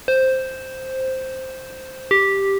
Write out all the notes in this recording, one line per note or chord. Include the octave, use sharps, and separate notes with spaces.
C5
G4